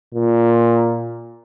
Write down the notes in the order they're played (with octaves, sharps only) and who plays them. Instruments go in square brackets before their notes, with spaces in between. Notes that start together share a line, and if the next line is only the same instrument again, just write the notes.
[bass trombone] A#2